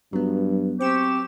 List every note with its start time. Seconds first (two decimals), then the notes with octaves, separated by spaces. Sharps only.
0.13 G2 F#3 B3
0.81 C4 G4 C#6 E7